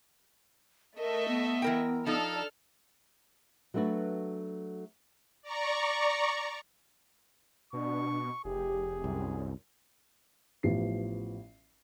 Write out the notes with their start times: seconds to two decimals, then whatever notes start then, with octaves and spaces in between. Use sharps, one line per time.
0.99 A3 A#4 D#5 E5
1.28 B3
1.62 E3 A#4 G5
2.06 F3 D4 D#4 A4 F6
3.74 F#3 A3 B3 D4 F#4
5.42 D5 A#5 C#6
7.73 B2 D4 C#6
8.45 F1 G4 G#4
9.04 C2 F#2
10.63 A1 F3 B3 G4 C7